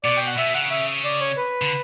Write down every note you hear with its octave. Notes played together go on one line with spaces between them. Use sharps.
B2 D5
G5
F#5
B2 E5
C#3 F#5
E5
D5
C#5
B4
D3